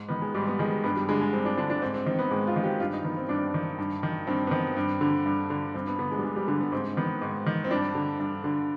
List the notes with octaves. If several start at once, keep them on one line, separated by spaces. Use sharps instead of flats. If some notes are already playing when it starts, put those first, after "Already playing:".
Already playing: G#2
D#3 B3
G#3
G#2 G3
B3
D#3 G#3
G2 B3
G3
D3 G#3
G#3
G2 C4
D4
D3 D4
D4
G#2 C4
C4
D#3 C4
B3
G#2 G#3
F4
D#3
G4
G2 F4
D#4
D#3 B3
C4
G2 D4
D#3
G2
D#3
G2 C4
B3
D#3 C4
G2
D3
G2
D3
G2 C4
B3
D3 B3
G#3
G3
G2 G#3
G3
D3 G3
B3
G#2 C4
D#3 B3
G#2
D#3
C4
G2 D4
D3
G2
D3